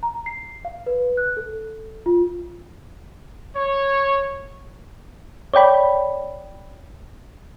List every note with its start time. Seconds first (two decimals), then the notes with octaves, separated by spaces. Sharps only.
0.03 A#5
0.26 C7
0.65 F5
0.86 B4
1.17 F#6
1.37 A4
2.06 F4
3.56 C#5
5.54 C#5 D5 G5 B5